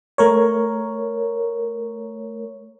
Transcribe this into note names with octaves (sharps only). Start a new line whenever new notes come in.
A3 A#4 C#5